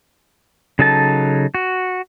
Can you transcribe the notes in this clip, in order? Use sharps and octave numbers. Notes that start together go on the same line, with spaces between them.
C#3 F#3 D#4 A4 A5
F#4